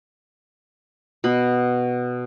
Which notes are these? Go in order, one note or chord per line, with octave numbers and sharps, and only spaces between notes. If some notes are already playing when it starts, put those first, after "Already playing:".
B2 B5